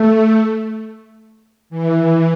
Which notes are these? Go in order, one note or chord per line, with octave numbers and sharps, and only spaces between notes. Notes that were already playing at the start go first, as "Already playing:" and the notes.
Already playing: A3
E3
E3